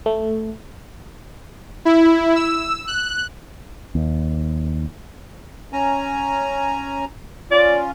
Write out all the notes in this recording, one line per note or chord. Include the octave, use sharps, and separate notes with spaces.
A3
E4
E6
F#6
D#2
C#4 G#5 A#5
C#4 F4 D5